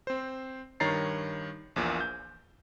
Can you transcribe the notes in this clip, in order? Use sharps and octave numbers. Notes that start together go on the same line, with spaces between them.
C4 C5
G2 D#3 C#5 A#5 A6 C7
A#1 E2 A#2
G6